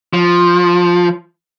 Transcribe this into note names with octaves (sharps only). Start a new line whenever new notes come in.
F3